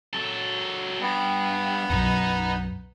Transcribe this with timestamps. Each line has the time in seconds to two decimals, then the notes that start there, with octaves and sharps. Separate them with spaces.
0.13 F#3 A4
1.01 G2 B3
1.90 B1 F#2 D#4 A#5